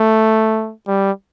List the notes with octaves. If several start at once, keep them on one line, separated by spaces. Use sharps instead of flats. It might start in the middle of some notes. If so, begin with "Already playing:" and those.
Already playing: A3
G3